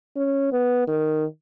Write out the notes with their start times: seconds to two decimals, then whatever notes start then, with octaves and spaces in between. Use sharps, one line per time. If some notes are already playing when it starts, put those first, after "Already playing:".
0.17 C#4
0.52 B3
0.88 D#3